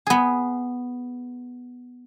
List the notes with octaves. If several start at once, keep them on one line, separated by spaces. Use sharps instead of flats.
B3 G#4